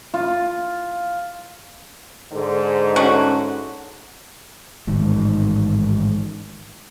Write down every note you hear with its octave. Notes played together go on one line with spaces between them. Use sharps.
F4
G#2 D3
A3 C#4 F#4
A1 G#2 D#3